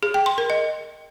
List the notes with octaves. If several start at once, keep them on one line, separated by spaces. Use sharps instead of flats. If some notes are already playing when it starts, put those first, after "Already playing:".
G#4
G5
C6
A#4
D#5